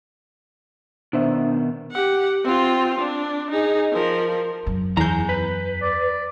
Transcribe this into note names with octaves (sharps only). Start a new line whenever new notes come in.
B2 D#3 D4 C5 E5
G4 F#5
C4 F4
D4
D#4 G#4
F3 A#4
F#2
E2 G#4 A#5 G6
B4
D5